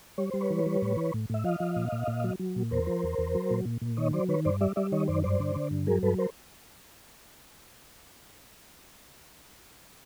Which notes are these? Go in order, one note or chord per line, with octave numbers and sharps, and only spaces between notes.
G3 C#5
G3 C5
B4 C#5
E3
G3
A2
E3
A2
A2 E5
F3 D#5 F5
F3
A#2
A#2
A#2
F#3
F#3
A#2
E2 A#4 C5
F3
E2
E2
F#3
A#2
A#2
A#2
D#3 C#5 D#5
F#3 C5 D5
D#3 B4 C#5
G2 C5 D5
G3 D5 E5
G3 D5 E5
D#3 C#5 D#5
F#2 C5 D5
G2 C5 D5
D3
D3
G2
F#3 G#4 A#4
G2 A4 B4
A#4 C5